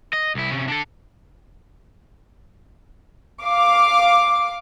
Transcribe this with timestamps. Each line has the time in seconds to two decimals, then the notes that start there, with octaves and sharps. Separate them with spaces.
0.13 D#5
0.35 C2 E4
0.51 C3 C#4
0.68 D4 A4
3.43 F5 D6